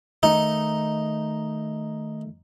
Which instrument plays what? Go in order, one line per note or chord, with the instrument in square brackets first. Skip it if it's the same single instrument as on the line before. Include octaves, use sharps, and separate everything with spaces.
[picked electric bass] D#3 A3 [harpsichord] D#4